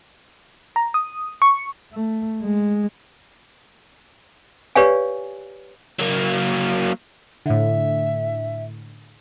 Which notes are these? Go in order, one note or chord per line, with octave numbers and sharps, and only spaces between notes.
A#5
D#6
C#6
A3
G#3
G4 B4 C#5 D5 F5 G#5
F#3 A#3
A2 D3 E5